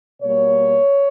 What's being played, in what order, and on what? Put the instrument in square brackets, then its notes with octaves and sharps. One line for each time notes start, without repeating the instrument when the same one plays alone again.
[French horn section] B2 G3 A#3 C#5